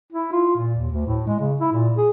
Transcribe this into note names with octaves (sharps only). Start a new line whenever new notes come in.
E4
F4
A#2
D#2
D2
A2
G#3
C#3
E4
A#2
G#4